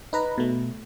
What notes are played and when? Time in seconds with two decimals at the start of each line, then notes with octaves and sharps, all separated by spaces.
0.13 D#4 B4 A#5
0.38 B2 A3